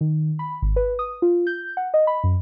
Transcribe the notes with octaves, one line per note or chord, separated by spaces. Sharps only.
D#3
B5
G#1
B4
D#6
F4
G6
F#5
D#5
B5
F#2